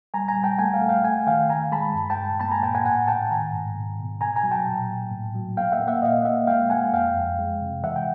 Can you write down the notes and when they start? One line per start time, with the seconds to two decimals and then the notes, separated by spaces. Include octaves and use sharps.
0.14 G3 G#5 A#5
0.28 G#5 A#5
0.36 G3
0.43 G5 A5
0.58 A3 F#5 G#5
0.74 F5 G5
0.81 A3
0.89 F5 G5
1.04 A3 F#5 G#5
1.27 D#3 F5 G5
1.49 D#3 G#5 A#5
1.72 G#3 A5 B5
1.94 G2
2.10 G5 A5
2.17 G2
2.40 A#3 A5 B5
2.51 G#5 A#5
2.63 A#2 G5 A5
2.75 F#5 G#5
2.85 A2 F#5 G#5
3.08 A2 G5 A5
3.31 D#3 G#5 A#5
3.53 G#2
3.75 B2
3.99 B2
4.21 B2 G#5 A#5
4.36 G#5 A#5
4.43 F#3
4.51 G5 A5
4.67 A#2
4.89 A#2
5.12 A2
5.35 F#3
5.57 A#3 F5 G5
5.72 E5 F#5
5.80 A#3
5.88 E5 F#5
6.02 A#2 D#5 F5
6.25 A#3 E5 F#5
6.47 G#3 F5 G5
6.70 G#3 F#5 G#5
6.93 F2 F5 G5
7.15 F2
7.39 G#3
7.61 C3
7.83 E3 E5 F#5
7.96 G5